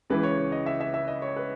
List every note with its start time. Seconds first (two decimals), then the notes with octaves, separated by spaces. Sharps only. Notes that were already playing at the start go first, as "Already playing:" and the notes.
0.10 C#2 C#3 E3 B4
0.23 C#5
0.38 C#5
0.52 D#5
0.66 E5
0.81 E5
0.94 E5
1.08 D#5
1.22 C#5
1.36 B4